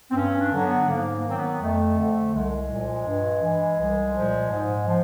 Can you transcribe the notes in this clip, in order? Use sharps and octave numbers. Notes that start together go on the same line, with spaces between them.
C4
G2 C#4
D4
D3 F#3
B3
G#2 A#3
A#3
D#3 F#3
C4
B3
F2 A3
D3 F3
C2 G#3
A#2 F3
G2
E3
C2
A#2 F3
G#2
F3